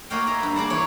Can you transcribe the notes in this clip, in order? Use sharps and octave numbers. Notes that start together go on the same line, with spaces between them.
A#3 F#4 C#5 D#5 F5 G5
D#5 E5 G#5 A#5
G2 B4
A#3 G#4 D5 F#5 A5
E3 C#5